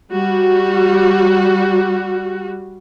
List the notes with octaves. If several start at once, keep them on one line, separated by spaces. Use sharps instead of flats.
G3 F#4